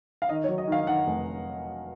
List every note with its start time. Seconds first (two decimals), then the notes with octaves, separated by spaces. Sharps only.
0.22 F5
0.29 D#3 D#5
0.44 C#5
0.48 F#3
0.58 D#5
0.68 D#3 F5
0.87 D#3 F#5
1.06 F1